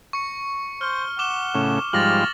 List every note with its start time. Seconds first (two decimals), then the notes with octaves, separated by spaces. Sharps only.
0.13 C#6 C#7
0.81 C5 F6 G7
1.19 F#5 D6 E7 G7
1.55 A2 C#3
1.93 G#2 F3 G3 F6 A6 A#6 F#7